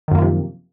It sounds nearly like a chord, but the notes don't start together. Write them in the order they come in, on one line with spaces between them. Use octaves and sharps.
D#3 F#2 A#3 F3 C3